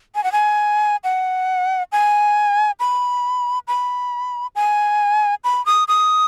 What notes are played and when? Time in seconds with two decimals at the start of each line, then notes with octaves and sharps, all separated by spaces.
0.15 G#5
0.24 F#5
0.32 G#5
1.04 F#5
1.92 G#5
2.80 B5
3.68 B5
4.55 G#5
5.44 B5
5.66 D#6
5.88 D#6